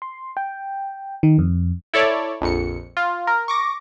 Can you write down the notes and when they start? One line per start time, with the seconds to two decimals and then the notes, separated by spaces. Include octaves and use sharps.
0.02 C6
0.37 G5
1.23 D#3
1.39 F2
1.94 E4 A4 C#5 D5
2.41 A#1 F2 C#7
2.97 F4
3.27 A#4
3.48 C#6 D6 A#6